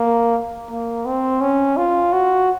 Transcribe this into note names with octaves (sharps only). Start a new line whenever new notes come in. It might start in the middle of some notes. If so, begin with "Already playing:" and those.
Already playing: A#3
A#3
C4
C#4
F4
F#4